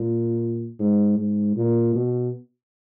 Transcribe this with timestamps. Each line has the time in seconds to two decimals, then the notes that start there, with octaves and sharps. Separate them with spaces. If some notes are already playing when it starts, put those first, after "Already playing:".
Already playing: A#2
0.79 G#2
1.18 G#2
1.56 A#2
1.95 B2